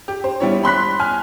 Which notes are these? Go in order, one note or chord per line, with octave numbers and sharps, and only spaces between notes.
G4
C5
G3 B3 E4 C#5
B5 C6 F#6 B6
G#5 F6